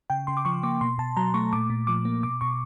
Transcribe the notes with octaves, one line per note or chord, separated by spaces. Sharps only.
C#3 G5
C#3 C6
D6
F3 C#6
A#3 D6
B2 C6
B2 A5
F#3 A#5
A3 C#6
A#2 D6
A#2
F3 D6
A#3
B2 D6
B2 C#6